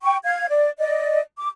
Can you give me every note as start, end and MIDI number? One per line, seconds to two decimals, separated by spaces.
0.01 0.17 79
0.01 0.17 85
0.24 0.46 77
0.24 0.46 92
0.49 0.70 74
0.78 1.20 74
0.78 1.20 75
1.37 1.48 86